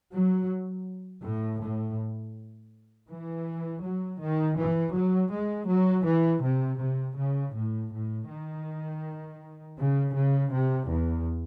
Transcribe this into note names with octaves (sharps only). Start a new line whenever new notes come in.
F#3
A2
A2
E3
F#3
D#3
E3
F#3
G#3
F#3
E3
C3
C3
C#3
A2
A2
D#3
C#3
C#3
C3
E2